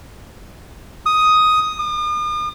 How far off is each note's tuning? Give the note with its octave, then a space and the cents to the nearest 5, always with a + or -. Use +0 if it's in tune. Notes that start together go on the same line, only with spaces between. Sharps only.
D#6 +5
D#6 -45